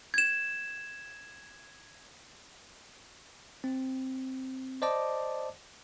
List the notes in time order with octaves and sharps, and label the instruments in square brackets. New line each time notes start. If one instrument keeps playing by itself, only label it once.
[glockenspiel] G#6 E7
[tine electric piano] C4
C5 D5 D#5 A5 D6